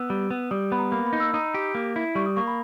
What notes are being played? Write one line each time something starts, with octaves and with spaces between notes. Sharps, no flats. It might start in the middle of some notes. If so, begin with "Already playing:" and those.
Already playing: B3 E6
G3
B3
G3 D#6
B3 B5
A#5
A#3 B5
B5
D#4
E6
D#4 D#6
G4
A#3
E4
G3 C#6
D#6
A#3 C#6
B5